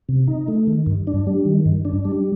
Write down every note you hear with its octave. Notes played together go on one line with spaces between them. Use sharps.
C3
D#4
A3
D#3
G2
D4
G3
D#3
G2
D4
G3